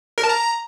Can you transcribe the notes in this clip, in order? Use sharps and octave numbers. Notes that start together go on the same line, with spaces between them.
A#4
A5
A#5